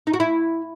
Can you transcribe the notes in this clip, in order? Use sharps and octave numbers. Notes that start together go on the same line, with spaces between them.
D#4
F#4
E4